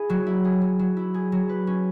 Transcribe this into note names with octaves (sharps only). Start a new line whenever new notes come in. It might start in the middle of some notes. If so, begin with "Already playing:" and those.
Already playing: E4 G#4
F#3
E4
G#4
F#3
F#3
E4
G#4
F#3
B4
C#4